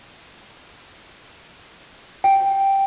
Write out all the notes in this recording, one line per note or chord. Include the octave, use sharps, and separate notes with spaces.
G5